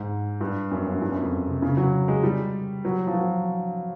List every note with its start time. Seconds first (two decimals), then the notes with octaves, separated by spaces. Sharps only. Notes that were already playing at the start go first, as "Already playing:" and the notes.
Already playing: G#2
0.41 G2
0.71 F#2
0.87 F#2
1.02 G2
1.12 F#2
1.21 F2
1.47 C3
1.62 C#3
1.77 F#3
2.08 G#3
2.23 G3
2.85 F#3
3.07 F3
3.14 F#3